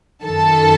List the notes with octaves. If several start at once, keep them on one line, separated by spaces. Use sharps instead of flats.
F#2 D#3 A4 A5